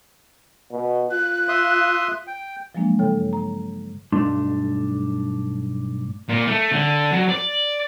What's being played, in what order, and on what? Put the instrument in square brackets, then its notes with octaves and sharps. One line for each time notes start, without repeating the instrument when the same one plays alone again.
[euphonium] B2
[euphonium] F4 [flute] F#6
[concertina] E5 C6 D#6
G5
[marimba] F3 F#3 G#3 A#3 D4
G2 C#3 A4 C#5 G5
A#5
[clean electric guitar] B1 G2 A3 D4 C6
[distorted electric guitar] A#2
A3
D3
F#3
D5